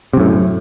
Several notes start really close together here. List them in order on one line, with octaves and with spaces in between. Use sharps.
C3 F#2 A2